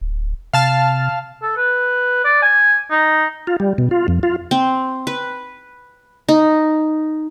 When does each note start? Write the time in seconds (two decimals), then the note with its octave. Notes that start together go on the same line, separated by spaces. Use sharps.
0.01 D1
0.53 C3 F5 A5 F6
1.42 A4
1.56 B4
2.25 D5
2.42 G#5
2.91 D#4
3.47 F4
3.60 G3
3.78 B2
3.91 F4
4.08 F2
4.23 F4
4.51 C4
5.07 B4
6.29 D#4